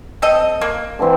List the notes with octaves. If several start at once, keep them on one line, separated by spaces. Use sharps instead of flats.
C4 A4 D#5
A#3
D3 E3 C4